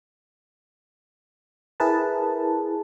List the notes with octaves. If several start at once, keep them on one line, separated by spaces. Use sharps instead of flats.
E4 G#4 A#4 B4 A5